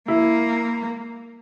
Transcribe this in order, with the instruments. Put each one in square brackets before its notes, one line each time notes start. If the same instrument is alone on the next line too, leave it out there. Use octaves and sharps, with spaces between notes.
[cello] A#3 [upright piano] E4